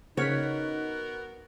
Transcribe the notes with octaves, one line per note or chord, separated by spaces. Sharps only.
C#3 B3 D#4 F#4 A#4 C#5 F6 B6